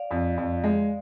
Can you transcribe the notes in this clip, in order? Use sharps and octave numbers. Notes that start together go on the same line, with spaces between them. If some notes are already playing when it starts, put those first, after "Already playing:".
Already playing: D5 F5
F2
F2
G#3